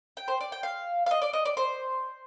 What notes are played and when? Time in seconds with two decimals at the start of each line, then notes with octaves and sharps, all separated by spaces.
0.17 G5
0.28 C5
0.41 D5
0.52 G5
0.63 F5
1.06 F5
1.11 D#5
1.22 D5
1.33 D#5
1.45 D5
1.57 C5